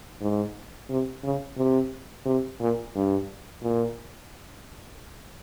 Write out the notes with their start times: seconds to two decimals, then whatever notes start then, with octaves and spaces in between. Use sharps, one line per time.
0.21 G#2
0.90 C3
1.24 C#3
1.58 C3
2.26 C3
2.61 A#2
2.96 G2
3.63 A#2